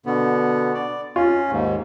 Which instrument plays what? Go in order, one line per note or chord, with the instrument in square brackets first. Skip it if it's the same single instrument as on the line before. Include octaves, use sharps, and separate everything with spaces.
[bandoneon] B2 D3 B3
D5
[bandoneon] C#4 [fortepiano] F4
[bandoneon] D#2 G#2